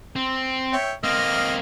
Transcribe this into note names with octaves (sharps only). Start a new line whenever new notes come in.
C4
C#5 E5 G5
A#3 C4 D#5 F6